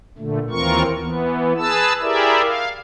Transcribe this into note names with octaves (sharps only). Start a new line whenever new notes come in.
A#2 D3 A3
D#2 E3 C4 F4 A#4 C#6
E3 B3
G#4 B4 A5 E6
E4 G4 G#4 A#4 D5 E5
F5